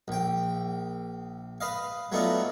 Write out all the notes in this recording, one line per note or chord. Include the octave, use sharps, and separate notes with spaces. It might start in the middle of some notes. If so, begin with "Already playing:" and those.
A#1 G5
B4 D#5 F5
F#3 A3 B3 D4 D#4 F4